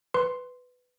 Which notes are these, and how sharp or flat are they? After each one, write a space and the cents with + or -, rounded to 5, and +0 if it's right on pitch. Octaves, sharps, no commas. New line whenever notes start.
B4 +10 C6 +0